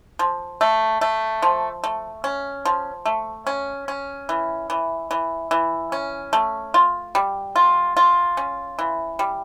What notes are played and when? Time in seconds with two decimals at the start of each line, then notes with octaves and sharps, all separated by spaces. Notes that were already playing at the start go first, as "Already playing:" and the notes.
0.19 F3
0.61 A3
1.01 A3
1.42 F3
1.84 A3
2.24 C#4
2.65 F3
3.06 A3
3.47 C#4
3.88 C#4
4.29 E3
4.70 E3
5.11 E3
5.51 E3
5.92 C#4
6.33 A3
6.74 F4
7.15 G3
7.56 F4
7.97 F4
8.37 C#4
8.79 E3
9.19 G3